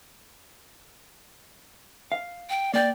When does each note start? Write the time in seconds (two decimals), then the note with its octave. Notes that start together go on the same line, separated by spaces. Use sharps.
2.12 F5
2.50 G5
2.74 A#3 D5 G5